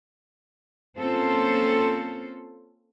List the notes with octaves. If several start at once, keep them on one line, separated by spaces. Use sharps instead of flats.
A#3 C4 C#4 F4 A4 C5